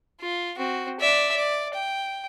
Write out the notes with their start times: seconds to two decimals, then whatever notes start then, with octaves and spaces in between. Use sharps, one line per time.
0.21 F4
0.57 C4 F#4
1.00 D5 E5
1.36 D5
1.74 G5